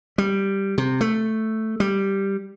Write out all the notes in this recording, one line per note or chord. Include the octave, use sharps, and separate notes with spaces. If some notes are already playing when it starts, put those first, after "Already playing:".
G3
C3
A3
G3